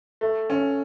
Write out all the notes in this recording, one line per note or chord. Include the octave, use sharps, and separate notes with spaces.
A3
C#4